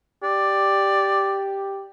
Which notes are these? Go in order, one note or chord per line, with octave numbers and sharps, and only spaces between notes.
G4 D5